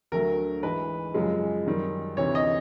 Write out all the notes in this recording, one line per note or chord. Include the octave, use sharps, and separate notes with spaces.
D2 D3 F#3 A3 A#4
G#2 E3 G#3 B4
F#2 C#3 F3 G#3
F#2 D#3 G3
D2 C3 E3 C#5
D#5